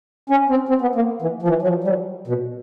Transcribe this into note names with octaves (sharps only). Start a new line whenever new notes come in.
C#4
C4
C4
B3
A#3
E3
F3
E3
F#3
F3
G3
F#3
B2